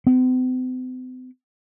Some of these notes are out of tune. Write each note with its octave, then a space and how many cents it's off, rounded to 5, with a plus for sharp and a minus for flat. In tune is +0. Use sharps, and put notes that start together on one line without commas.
C4 -45